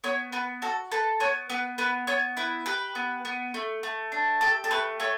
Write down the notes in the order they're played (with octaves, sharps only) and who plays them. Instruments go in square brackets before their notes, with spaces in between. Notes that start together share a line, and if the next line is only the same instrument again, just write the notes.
[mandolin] B3 C#5
B3 B4
F#4 A4
A4 B4
B3 C#5
B3 B4
B3 B4
B3 C#5
E4 B4
G4 B4
B3
B3
A3
A3
D4
G4 A4
A4
A3 B4
A3 C#5